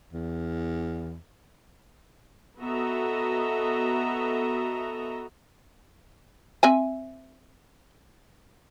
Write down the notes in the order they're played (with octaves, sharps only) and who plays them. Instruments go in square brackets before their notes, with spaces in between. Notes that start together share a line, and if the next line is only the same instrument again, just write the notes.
[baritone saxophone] E2
[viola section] B3 F#4 A4 D#5 E5 A#5
[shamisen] C4 E5 G#5